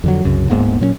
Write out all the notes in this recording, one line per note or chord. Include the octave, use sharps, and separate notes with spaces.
F2 D3 F#3
C2 F#2 C#3
D1 G#2 A#3 B3
A#2 F#3 C4 C#4